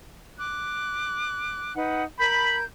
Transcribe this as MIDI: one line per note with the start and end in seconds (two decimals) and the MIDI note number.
0.38 1.73 86
0.38 1.73 90
1.75 2.03 63
1.75 2.03 71
1.75 2.03 78
2.18 2.63 70
2.18 2.55 83
2.18 2.63 91